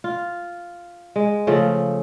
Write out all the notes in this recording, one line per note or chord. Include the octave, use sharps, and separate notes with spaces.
F4
G#3
C#3 F3 A3